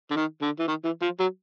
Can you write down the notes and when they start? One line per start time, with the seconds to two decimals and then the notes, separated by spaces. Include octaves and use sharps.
0.11 D3
0.16 D#3
0.42 D3
0.59 E3
0.68 D#3
0.85 E3
1.02 F3
1.20 F#3